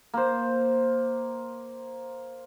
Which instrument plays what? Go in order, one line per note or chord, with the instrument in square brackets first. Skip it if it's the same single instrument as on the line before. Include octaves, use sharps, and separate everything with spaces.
[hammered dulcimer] A#3 C5